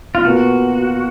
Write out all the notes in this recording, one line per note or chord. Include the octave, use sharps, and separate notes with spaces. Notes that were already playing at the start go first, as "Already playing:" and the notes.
F4
B2 A#3 F4 F#4 A#4